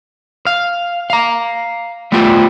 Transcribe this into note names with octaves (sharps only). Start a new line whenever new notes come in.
F5
F5 A#5
G3 A3 B3 C4 F4 G4